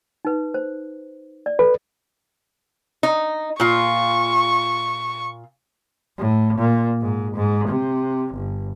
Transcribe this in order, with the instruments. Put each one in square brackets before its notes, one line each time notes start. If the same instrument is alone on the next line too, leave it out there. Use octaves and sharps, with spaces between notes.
[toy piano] D#4 B4
C5
D5
[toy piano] A4 [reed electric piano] B4
[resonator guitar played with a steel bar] D#4
[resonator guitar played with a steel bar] A#2 F4 [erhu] C#6
[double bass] A2
A#2
G#2
G#2
C3
G1